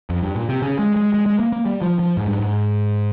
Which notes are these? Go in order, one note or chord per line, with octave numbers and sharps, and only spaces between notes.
F2
G2
A#2
C3
C#3
G#3
G#3
G#3
G#3
A#3
A#3
G3
F3
F3
G#2
G2
G#2